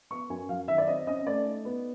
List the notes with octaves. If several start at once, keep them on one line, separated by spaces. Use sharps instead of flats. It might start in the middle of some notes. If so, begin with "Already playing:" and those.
B3 C#6
F#2 G#5
F#3 F5
D#3 E5
D5
C4 D#5
C#4 D#5
A3 D5
D#4
B3